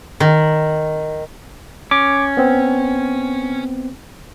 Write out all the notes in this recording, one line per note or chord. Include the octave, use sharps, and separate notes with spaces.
D#3
C#4 D6
B3 C4